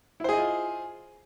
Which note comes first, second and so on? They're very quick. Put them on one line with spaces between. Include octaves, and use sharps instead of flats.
E4 C5 G#4 D#5 F4